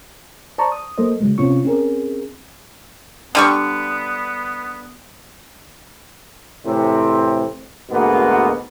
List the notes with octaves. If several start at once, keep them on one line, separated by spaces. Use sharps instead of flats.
C5 D5 A5 A#5 C#6
D#6
F#3 A#3 A4 C5 D#5
C#3 F#3 G#3
C3 C4 C#4 F4 C#6
C4 C#4 G#4 A#4
D3 G3 B3 C#6
A2 C3 E3 C4
D2 G#2 B2 G#3 A#3 B3